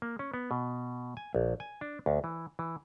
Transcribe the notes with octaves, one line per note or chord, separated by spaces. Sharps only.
A#3
C#4
B3
B2
G#5
A#1
G#5
D4
D2
E3
E3